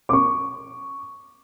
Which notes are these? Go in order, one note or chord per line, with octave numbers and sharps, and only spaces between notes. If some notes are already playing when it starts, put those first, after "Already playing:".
C#6 D6